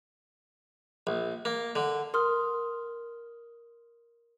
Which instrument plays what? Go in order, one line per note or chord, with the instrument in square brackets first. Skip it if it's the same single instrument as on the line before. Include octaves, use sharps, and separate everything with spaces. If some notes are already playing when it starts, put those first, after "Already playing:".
[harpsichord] A#1
A#3
D3
[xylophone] A#4 C6 D#6 F6